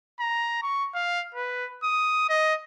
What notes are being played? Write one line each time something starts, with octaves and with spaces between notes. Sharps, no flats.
A#5
C#6
F5
B4
D#6
D#5